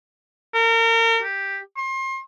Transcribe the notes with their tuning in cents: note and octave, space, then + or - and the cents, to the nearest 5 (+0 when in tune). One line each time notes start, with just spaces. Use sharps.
A#4 -35
G4 +5
C6 +35